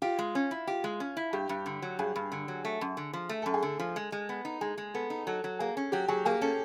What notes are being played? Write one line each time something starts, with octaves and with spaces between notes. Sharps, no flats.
F4 G4
G#3
C#4
E4
F4 G4
G#3
C#4
E4
G2 G4
G2
D3
F#3
G2 G#4
G2
D3
F#3
A3
F#2
D3
F3
A3
F#2 A4
G#4
D3 A4
F3
G#3
G#3
B3
D#4
G#3 G#4
G#3
B3 A4
D#4
F#3 A4
F#3
A#3 G#4
C#4
F#3 G4
F#3 G#4
A#3 G#4
C#4 A4